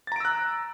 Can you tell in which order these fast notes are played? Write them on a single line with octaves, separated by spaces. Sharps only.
A6 A#5 D7 E6 F#6